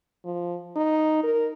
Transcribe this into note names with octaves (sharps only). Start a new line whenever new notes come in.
F3
D#4
A#4